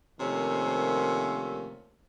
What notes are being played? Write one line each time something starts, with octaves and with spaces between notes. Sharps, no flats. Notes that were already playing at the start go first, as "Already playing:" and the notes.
C3 D#3 F3 A3 A#3 C#4